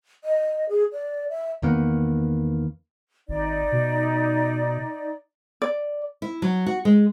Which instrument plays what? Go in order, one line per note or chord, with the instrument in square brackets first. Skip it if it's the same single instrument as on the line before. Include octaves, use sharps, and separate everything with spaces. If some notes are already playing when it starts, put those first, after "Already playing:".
[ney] D#5
G#4
D5
E5
[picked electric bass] E2 D#3 A#3 B3
[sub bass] G#1 [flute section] D#4 D5
[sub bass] B2
[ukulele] D5
[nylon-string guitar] E4
F#3
F#4
G#3